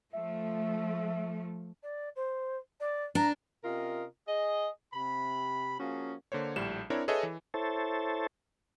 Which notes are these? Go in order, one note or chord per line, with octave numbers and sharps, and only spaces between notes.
F3 A3 E5
D5
C5
D5
D4 A#5
C3 C#4 F4 A#4 D#5
G#4 D#5
C3 B5
F3 A#3 C#4 F#4 G#4
D3 A#3 C5 C#5
A#1 A2 G3 E7
C4 D4 E4 A#4 C#5
G#4 A4 B4 C#5 D#5 E5
E3
E4 A4 C5 C#5 A5